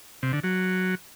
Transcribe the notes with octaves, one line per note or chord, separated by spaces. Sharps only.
C3
D3
F#3